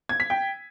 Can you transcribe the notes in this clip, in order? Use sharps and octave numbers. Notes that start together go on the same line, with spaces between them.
G#6
B6
G5